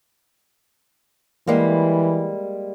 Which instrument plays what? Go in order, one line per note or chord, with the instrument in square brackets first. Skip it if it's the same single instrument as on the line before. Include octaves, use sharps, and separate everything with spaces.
[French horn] E3 [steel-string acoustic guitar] G3 G#3 A#3